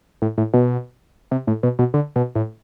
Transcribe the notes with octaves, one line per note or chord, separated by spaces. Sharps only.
A2
A2
B2
C3
A2
B2
B2
D3
B2
A2